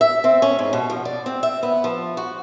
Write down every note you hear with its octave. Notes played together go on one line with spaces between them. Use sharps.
E5
C4
C#4
G#2
B2
F3
D5
C4
E5
B3
F3
F#4